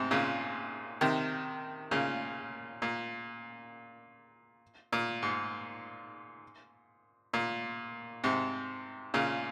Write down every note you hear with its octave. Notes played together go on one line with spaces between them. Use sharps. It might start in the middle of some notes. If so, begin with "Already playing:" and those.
Already playing: G#2 C3
A#2 C#3
C3 D#3
A#2 C#3
A#2
A#2
G#2
A#2
G#2 C3
A#2 C#3